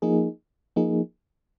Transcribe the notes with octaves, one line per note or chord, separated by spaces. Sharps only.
F3 A#3 D#4 G#4
F3 A#3 D#4 G#4